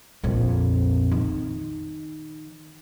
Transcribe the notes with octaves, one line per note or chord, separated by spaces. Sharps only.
A#1 F2
D#3